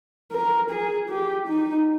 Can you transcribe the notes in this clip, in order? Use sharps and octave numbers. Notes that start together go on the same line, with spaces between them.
A#4
G#4
G4
D#4